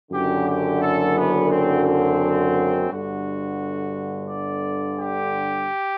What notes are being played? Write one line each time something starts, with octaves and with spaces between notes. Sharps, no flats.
F#1 F#2 D3 G4
G4
A4
B3
C4
C4
G1 G2 D3 F#4
D5
G4